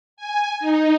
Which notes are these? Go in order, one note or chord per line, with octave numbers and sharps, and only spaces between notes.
G#5
D#4